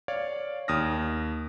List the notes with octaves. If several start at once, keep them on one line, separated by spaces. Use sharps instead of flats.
C#5 D5 F5
D#2 D#6 F6 A#6